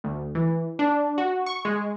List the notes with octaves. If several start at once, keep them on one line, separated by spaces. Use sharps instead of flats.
D2
E3
D4
F#4
C#6
G#3